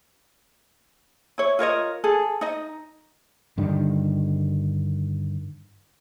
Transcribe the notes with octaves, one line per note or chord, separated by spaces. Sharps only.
E4 C#5
F4 A#4 C#5 D#5
G#4 A4
D#4 D#5
G2 D3 D#3 G3